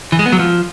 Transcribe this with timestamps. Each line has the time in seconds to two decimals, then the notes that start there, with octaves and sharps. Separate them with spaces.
0.12 E3
0.19 G#3
0.26 B3
0.33 F#3
0.39 F3